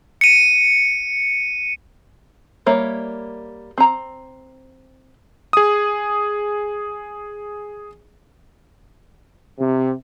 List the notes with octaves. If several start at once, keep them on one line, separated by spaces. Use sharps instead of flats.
C#7 D#7
G3 A#3 C#5 E5
C4 A#5
G#4 D#6
C3